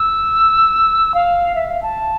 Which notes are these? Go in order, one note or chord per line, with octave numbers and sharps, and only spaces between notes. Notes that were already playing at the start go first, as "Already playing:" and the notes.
Already playing: E6
F5
E5
F5
A5